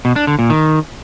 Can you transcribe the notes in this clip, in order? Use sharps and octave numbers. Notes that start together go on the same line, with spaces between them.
B2
D4
D3
A#2
D#3